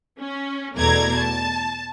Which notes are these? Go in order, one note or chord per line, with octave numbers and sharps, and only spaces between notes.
C#4
E2 B2 A3 D5 A#5 G#6
A5